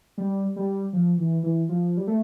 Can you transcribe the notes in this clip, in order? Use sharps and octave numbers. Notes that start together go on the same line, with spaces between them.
G3
G3
F3
E3
E3
F3
G3
A3